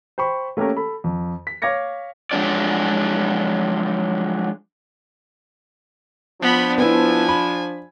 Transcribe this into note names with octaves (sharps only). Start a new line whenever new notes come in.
C5 G5 B5 C#6
A3 A#3 C#4 G4 A#4
A4 B5
F2
B6
C#5 F5 D6 G#6 A#6 C#7
F3 F#3 G#3 D4 D5
F3 B3 D4 B5
B3 E4 G#5
B5